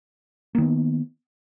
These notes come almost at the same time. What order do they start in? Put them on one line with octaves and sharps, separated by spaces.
A#3 D#3 B3